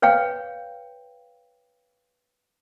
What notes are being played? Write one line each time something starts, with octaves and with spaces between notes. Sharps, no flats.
B4 C#5 F5 G5